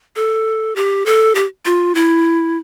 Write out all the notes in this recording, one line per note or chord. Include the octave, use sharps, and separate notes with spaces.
A4
G4
A4
G4
F4
E4